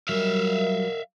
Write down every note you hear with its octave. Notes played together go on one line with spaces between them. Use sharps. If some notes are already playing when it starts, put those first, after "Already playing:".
F#3 G3 A#4 E5 F5